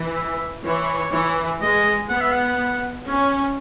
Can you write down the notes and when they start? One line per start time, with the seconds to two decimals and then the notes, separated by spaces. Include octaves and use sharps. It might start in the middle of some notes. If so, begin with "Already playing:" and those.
Already playing: E3
0.15 E5
0.64 E3 C#5
1.12 E3
1.61 G#3 D#5
2.09 B3 F#5
2.21 E5
2.32 F#5
3.07 C#4